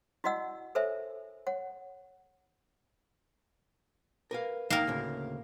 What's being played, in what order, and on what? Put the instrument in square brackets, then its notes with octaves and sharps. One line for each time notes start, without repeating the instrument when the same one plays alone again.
[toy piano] E4 F#4 D5 D#5 F#5 E6
A4 A#4 C5 C#5 E5 G#5
C#5 F#5
[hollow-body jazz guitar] A#4 B4 F5
[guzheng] A#3 A#4 [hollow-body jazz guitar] D#4 G5
[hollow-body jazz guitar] D2 A2 C#3